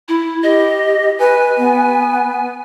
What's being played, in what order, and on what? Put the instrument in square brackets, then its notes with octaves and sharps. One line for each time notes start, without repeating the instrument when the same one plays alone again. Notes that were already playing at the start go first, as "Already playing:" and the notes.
[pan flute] E4
[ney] G4 [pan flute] D#5
[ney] B4 [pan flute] G#5
[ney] B3